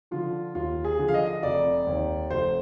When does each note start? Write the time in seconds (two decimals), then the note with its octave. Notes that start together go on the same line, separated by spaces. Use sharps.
0.11 D3 F3 F4
0.55 D#2 F4
0.84 G#4
0.99 D3 F3
1.08 F5
1.14 D#5
1.43 F1 D5
1.87 D#2 D#3
2.31 F1 C5